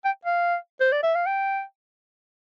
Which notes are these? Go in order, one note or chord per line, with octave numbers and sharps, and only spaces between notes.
G5
F5
C5
D5
E5
F5
G5